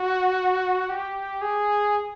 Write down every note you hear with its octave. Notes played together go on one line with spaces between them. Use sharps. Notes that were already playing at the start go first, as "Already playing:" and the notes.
Already playing: F#4
G4
G#4